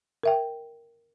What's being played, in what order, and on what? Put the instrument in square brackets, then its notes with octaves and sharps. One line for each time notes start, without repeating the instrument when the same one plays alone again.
[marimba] A#4 E5 G5